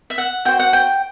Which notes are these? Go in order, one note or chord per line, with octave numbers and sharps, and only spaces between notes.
E5
F#5
F#4 C5 G5
F#5
G5